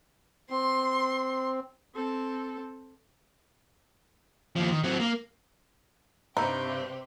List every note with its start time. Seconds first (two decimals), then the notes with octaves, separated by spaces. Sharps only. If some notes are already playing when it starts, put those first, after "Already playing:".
0.50 C4 C6
1.94 C4 A4
4.56 D#2 F3
4.71 D#3
4.84 F#3 C4
5.00 A#3
6.37 G2 C3 C4 D#4 G4 B5 E6 G6